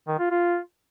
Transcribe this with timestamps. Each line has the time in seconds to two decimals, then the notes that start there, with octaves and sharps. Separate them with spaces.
0.08 D#3
0.19 F4
0.31 F4